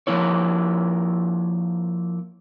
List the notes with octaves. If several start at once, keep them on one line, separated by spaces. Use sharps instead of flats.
F3 A#3 E4 C#5